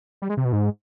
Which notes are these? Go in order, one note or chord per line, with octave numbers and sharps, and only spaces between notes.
G3
G#3
C3
B2
G#2